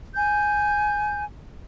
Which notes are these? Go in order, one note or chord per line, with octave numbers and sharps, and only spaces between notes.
G#5 G6